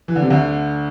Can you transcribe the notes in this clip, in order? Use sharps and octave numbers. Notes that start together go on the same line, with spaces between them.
E3
D3
C3
D2 D3